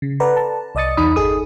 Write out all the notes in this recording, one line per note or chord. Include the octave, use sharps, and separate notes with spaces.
C#3
A4 B4 D5 F#5 A#5
A5
C2 D5 D#5 D#6 A6 C#7
E2 D#4 B5 D#6
G1 D#4 G#4 A4 D#6